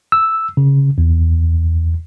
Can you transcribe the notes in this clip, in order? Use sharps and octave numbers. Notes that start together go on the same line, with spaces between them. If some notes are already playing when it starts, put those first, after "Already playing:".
E6
C#3
E2